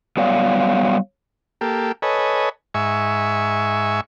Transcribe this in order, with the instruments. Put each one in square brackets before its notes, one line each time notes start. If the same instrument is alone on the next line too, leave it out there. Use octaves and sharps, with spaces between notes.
[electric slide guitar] F#3 G3 B3 C#5 D5 F5
[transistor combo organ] A#3 G4 A4
A4 B4 C#5 D#5 G#5
G#2 E5 G#5 C#6